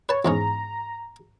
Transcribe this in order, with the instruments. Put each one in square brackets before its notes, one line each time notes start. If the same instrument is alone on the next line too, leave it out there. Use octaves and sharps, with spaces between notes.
[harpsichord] B4 A5 [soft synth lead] C#5
[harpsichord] E2 G#2 C#4 [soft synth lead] A#5